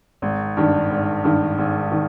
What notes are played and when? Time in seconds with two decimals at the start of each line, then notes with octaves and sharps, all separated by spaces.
0.22 G#1
0.57 G2 D#3
0.91 G#1
1.24 G2 D#3
1.58 G#1
1.91 D#3